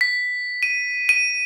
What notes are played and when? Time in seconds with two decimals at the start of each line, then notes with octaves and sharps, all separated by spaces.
0.01 B6
0.63 D#7
1.09 D#7